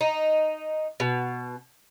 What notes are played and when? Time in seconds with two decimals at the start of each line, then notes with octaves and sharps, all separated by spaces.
0.01 D#4
1.00 B2